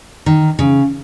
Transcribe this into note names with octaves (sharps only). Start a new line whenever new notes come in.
D#3
C#3